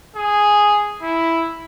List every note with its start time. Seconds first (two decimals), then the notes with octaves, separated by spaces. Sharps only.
0.16 G#4
1.02 E4